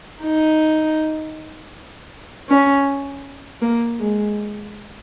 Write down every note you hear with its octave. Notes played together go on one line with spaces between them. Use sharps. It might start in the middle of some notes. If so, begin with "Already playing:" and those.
D#4
C#4
A#3
G#3